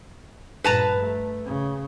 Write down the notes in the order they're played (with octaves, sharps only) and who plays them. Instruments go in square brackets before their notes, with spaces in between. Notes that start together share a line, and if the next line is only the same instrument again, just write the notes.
[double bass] G2 A#2 [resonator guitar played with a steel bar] B4 A5 A#5
[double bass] A3
C#3